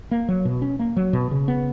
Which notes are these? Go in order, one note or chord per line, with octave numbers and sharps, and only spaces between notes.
A#3
F#3
B2
C#4
A#3
F#3
B2
C#3
B3